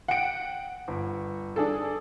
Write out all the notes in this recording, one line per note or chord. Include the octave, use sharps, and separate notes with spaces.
F#5 G5 D7
G1
D4 G#4 A4